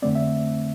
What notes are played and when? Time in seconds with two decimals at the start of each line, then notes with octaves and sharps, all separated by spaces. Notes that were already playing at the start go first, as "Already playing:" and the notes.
0.02 F2 D3 A3 C4 D5
0.15 E5